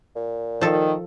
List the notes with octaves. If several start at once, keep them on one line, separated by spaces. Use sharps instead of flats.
A#2
D#3 F3 A4